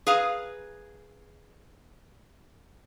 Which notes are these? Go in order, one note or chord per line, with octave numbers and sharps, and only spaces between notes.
G#4 B4 F5 A#5